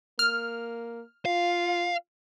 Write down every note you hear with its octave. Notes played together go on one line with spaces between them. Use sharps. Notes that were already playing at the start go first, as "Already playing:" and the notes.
A#3 F6
F4 F5